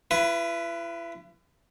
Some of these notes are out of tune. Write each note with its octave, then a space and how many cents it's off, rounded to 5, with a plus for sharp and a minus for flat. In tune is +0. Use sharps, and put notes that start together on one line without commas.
E4 +40 B4 +0